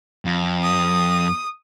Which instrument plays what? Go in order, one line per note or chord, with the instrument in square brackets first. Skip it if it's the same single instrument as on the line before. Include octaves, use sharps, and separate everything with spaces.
[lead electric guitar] F2
[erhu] D#6